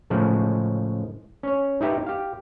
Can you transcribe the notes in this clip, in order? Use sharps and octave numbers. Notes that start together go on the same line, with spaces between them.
A2 C#3 F3 G#3
C#4 C#5
D#4 E4 G4 B4
G4 F5